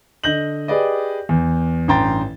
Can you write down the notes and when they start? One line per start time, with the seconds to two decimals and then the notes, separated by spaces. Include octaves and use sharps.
0.24 D3 D#5 G6 A#6 F#7
0.68 G4 G#4 B4 D5 D#5
1.29 E2
1.88 A1 G2 G5 A#5 C6 A6